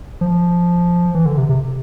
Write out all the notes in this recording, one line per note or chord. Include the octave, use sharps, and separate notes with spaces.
F3
E3
D3
C3
C3